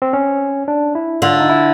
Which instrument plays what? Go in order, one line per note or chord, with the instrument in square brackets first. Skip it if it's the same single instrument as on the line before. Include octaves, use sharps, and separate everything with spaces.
[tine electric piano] C4
C#4
D4
E4
[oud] D3 [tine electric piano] F4
[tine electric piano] D#4
E4